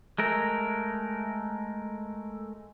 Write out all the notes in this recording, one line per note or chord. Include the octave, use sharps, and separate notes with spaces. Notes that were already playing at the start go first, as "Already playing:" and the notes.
G#3 A3 A#4